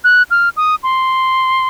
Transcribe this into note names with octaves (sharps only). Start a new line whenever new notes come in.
F#6
F6
D#6
C6